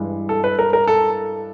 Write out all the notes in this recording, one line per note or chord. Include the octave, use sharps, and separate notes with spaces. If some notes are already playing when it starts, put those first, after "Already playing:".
Already playing: G2 E3 G#3
A4
B4
A#4
A#4
A4